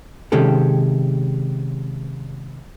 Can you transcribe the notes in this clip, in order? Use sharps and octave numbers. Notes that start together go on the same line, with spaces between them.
C3 D#3 G#3 C#4 G4 A4